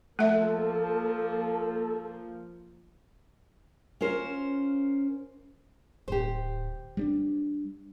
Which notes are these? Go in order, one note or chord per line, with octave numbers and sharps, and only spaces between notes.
F3 A3 A#3 A4 E5
C#4 F4 A#4 C5
D1 G4 C5
G3 B3 D4